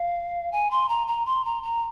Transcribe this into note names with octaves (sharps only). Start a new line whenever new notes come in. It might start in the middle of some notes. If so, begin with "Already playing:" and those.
Already playing: F5
G#5
C6
A#5
A#5
C6
A#5
A#5